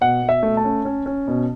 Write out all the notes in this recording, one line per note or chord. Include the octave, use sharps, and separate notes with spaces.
B2 F#5
B2
E5
A3
A5
C#4
C#4
C#4
B2